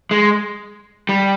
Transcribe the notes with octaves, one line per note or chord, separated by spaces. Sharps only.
G#3
G3